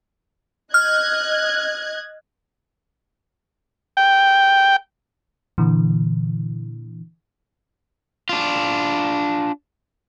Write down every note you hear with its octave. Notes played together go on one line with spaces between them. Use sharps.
D#5 F6 F#6 G#6
G5
A#2 D3 E3
D4 F4